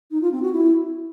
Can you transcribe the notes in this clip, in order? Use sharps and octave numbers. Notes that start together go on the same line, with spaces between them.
D#4
F4
C4
F#4
E4